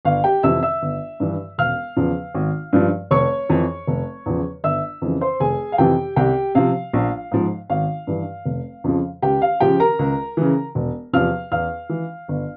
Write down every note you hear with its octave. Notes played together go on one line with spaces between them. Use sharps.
G1 F5
G4 G5
F2 C3 E3 E5 E6
E5 E6
G1
G2 E3
E1 F5 F6
E2 C#3 F3
G#1
G2 F3
F1 C#5 C#6
F2 E3
F1
E2 C#3 F3
G1 E5 E6
F2 C#3 E3
C5 C6
F1 G#4 G#5
F5
F2 C3 E3 G4 G5
C2 G4 G5
C3 F3 F5
A#1
G#2 F3
G#1 F5
G2 E3
F1
F2 C#3 F3
C#2 G4 G5
F5
C#3 F3 G4 G5
A#4 A#5
C#2
C#3 E3
E1
E2 C3 F3 F5 F6
E2 F5 F6
E3
G1